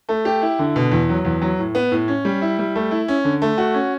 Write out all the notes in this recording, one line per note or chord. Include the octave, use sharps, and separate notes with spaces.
A3
G4
E4
D3
B2
E2
F#3
E2
F#3
A2
B3
A2
C#4
G3
E4
G3
A3
E4
C#4
D3
A3
F#4
C#4